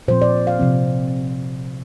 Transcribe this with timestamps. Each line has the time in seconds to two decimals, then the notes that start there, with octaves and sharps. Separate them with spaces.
0.08 A#2 F3 C4 C5
0.22 D5
0.47 F5
0.59 C3 F3 C4